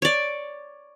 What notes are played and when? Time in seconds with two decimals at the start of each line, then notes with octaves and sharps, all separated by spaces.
0.02 C#5 D5